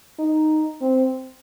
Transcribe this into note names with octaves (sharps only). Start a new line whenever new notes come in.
D#4
C4